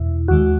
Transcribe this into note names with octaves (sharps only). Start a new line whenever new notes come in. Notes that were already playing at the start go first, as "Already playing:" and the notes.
Already playing: E2 B2 E4
D#2 D#3 G#3 F#4